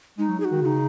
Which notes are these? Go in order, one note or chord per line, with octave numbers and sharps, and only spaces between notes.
G#3 D#4
F#3
G#4
F#4
D#3
C#3 D#4 F#4